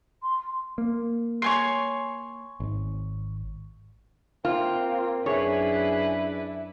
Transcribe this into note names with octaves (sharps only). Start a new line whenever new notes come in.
C6
A#3
C#5 G#5 C6
G#1
A#3 C4 F4
F#2 D4 E4 G#4 B4 C#5